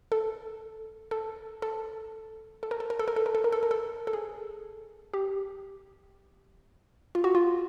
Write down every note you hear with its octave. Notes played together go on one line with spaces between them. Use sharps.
A4
A4
A4
A4
A#4
A4
A#4
A4
A#4
A4
A#4
A4
A#4
A4
A#4
A4
A4
G#4
G4
F4
F#4
F4